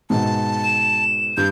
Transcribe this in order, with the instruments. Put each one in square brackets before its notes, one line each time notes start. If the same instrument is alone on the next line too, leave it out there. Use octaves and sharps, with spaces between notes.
[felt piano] G#2 B2 [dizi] A5
[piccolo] E7
[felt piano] G2 [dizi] G6